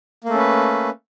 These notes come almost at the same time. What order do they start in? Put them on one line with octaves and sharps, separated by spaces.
A#3 A3 C#4 B4